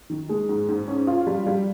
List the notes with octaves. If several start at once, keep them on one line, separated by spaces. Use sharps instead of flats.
D#3
G#3
G#2
G#2
C#4
F4
G3
G3